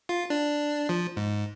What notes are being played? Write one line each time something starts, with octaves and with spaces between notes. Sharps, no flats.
F4
D4
F3
G#2